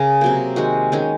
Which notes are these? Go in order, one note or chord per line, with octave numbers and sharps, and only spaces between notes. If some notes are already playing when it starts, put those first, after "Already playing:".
Already playing: C#3 G#4 A#4
C3 F#3 A#3
D#3 G#3 F#4
D#3 G#3 C#4